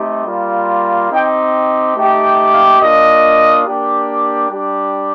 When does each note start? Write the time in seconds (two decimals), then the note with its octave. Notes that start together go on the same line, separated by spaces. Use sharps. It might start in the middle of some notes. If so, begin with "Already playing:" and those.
Already playing: A3 C4 D#4 G4
0.26 G3 A#3 F4
1.11 C4 D#4 G4 G5
1.96 A3 D#4 G4
2.24 G5
2.52 F5
2.81 A#3 D4 F4 D#5
3.66 A#3 D4 G4
4.50 G3 D4 G4